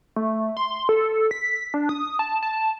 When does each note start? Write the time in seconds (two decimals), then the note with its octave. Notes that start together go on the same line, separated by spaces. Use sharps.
0.16 A3
0.57 C6
0.89 A4
1.31 B6
1.74 D4
1.89 D#6
2.19 A5
2.43 A5